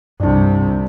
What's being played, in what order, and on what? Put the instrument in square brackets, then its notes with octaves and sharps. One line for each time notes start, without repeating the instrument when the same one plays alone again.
[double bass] C2 C3 [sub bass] G2 [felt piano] D4 D5